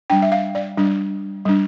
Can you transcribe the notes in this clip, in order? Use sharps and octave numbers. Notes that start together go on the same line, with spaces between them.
G3 D4 G5
E5
F5
D5
G3 D4
G3 D4